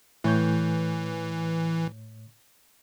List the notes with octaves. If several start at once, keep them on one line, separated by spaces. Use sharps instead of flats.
A2 E3 C#5 G6